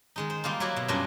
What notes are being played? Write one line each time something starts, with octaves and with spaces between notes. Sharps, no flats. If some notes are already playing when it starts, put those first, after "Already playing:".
D#3 G#3 D#4
C5
G3 A#3 D#4 F4
F#3 E4 F#4 D5 D#5
B2
F#2 A#2 G3 D4 F4 D#5